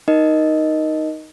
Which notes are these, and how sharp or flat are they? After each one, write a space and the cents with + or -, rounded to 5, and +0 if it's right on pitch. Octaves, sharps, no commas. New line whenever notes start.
D#4 +0 A#4 +10 D#5 +0